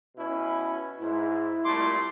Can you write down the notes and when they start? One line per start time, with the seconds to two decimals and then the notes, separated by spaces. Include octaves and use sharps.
0.17 B2 C#4 E4
0.99 G#2 E4
1.65 C2 A#2 A3 C6 D6